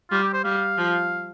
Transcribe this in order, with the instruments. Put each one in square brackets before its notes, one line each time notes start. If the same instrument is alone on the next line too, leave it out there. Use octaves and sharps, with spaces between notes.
[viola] G3 [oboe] F4
[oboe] G4
C5
[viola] G3 [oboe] F5
[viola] F3